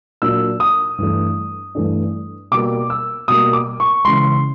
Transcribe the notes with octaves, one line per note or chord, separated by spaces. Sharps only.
A#2 F#3 A#3 D4 E6
D#6
G2 E3 A3 D4
G2 E3 A3 D4
B2 G3 A#3 D6
E6
B2 G3 A#3 D#6
D6
C#6
C#3 E3 G#3 C6